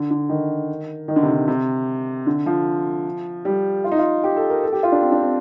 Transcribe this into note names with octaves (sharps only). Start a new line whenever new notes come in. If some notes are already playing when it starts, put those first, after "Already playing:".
Already playing: D3
D3
D#3
D#3
D3
C3
D3
C3
D3
F3
G3
F4
D#4
F4
G4
A4
A#4
A4
G4
F4
D4
C4
D4
C4